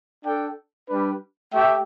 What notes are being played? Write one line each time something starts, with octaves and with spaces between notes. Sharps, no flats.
D4 A4 G5
G3 D4 B4
A3 G4 E5 G5